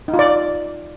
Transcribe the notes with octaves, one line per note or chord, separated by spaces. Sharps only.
D#4
F4
D5